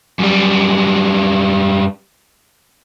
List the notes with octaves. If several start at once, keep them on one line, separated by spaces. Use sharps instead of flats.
F#2 G3